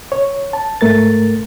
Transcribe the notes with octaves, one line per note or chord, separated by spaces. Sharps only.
C#5
A5
G#2 A3 A#4 A6